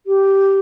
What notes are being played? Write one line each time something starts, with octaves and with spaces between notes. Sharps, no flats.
G4